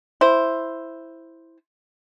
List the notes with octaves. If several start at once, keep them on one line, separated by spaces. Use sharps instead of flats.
E4 C5